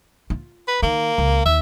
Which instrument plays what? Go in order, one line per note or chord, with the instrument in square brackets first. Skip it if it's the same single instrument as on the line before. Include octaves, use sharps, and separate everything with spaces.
[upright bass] F4
[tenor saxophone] B4
[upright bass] D#3 [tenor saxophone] A#3
[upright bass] C#2
[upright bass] D#2 [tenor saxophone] E5